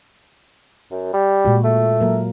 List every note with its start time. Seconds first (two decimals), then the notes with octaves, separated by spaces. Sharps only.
0.91 F#2
1.13 G3
1.45 A#2 G#3 F#4
1.64 A3
2.01 F#3 A#3 A#4